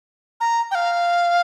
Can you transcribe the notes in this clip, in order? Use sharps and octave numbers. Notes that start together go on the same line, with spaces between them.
A#5
G5
F5